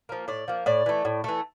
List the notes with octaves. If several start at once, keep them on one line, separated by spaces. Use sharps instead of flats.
F3 A#3
A2 D5
F3 A#3
A2 D5
E3 A3
A2
E3 A3